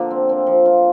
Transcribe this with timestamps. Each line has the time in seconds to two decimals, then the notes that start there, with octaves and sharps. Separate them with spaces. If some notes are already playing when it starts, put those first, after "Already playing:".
Already playing: D3 F3 A#3
0.11 C4
0.29 C4
0.47 F3
0.66 F4